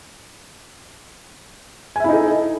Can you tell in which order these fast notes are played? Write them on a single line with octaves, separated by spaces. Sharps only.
G#5 E5 E4 D#4 A4